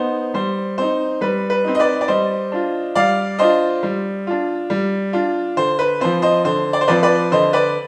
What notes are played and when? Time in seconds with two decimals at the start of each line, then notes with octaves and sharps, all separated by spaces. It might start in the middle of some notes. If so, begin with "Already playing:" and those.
Already playing: B3 D#4 C5
0.34 G3 C5
0.78 C4 D#4 C5
1.21 G3 B4
1.50 B4
1.64 C4 D#4
1.75 D#5
1.79 B4 D5
2.01 D5
2.08 G3 C5 D#5
2.52 D4 F4
2.95 G3 D5 F5
3.39 D4 F4 C5 D#5
3.83 G3
4.27 D4 F4
4.70 G3
5.13 D4 F4
5.57 D3 C5
5.79 B4
6.00 F3 C4 C5
6.22 C5 D#5
6.45 D3 C5
6.73 D5
6.81 C5
6.88 F3 C4 B4 D5
7.03 B4 D5
7.32 D3 C5 D#5
7.53 B4 D5